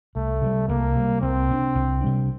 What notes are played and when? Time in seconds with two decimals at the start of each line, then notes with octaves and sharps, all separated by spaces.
0.15 C2 A3
0.42 C3 E3 G3
0.69 C2 A#3
0.96 C3 E3
1.00 G3
1.21 C2 C4
1.49 C3 G3 D4
1.75 C2
2.01 C3 G3 D4